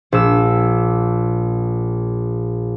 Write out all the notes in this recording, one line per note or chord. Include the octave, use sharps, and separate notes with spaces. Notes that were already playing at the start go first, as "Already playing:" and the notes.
A#1 E6